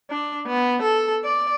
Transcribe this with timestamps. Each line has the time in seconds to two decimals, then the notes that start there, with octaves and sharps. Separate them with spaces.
0.10 D4
0.47 B3
0.82 A4
1.24 D5